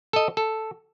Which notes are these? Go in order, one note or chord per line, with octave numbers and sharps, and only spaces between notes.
A4 D#5
A4